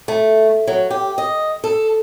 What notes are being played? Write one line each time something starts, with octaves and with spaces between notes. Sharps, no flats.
A3
F#3
G4
D#5
A4